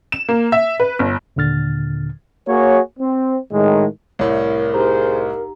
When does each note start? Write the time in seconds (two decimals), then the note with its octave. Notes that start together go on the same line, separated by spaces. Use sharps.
0.12 E7
0.29 A#3
0.52 E5
0.80 B4
0.99 G1
1.36 D#2 A#2 D3 F6 A6
2.48 A#3 F#4 G#4 C#5
2.99 C4
3.51 A2 D#3 G#3
4.19 C2 A2 A#4 C#5 D5
4.74 D#4 G4 G#4 C5 A#5